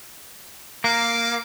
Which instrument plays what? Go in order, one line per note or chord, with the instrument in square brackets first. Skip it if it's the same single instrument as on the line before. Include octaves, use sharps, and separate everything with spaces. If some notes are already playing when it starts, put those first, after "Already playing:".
[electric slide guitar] A#3 [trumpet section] F5 D6